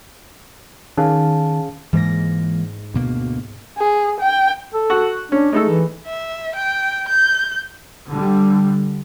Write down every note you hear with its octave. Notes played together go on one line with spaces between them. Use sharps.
D#3 C#4 G#4 F5 A5
G#2 E3 G#3 A#3 A#6
D2 B2 A#3
G#4
G5
A4
F#4
C#4 D4
G#3 A3 D#4 A4
E3
E5
G5
G6
D3 G3